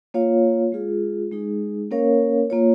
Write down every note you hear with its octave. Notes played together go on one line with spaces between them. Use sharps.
A#3 F4 C#5 F5
G#3 F4 G#4
G#3 D#4 G#4
A#3 C#4 A#4 C#5 F5
A#3 F4 C#5